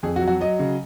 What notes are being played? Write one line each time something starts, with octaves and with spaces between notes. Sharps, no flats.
F2 G#4
F#4
F#3
F#4
F#3 D#5
C#3